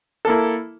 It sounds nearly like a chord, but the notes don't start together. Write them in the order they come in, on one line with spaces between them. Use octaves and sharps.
A4 A#3 E4